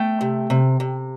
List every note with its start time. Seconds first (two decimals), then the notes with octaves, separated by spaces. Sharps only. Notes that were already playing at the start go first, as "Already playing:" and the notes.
Already playing: A3 G5
0.21 C3
0.50 C3
0.80 C3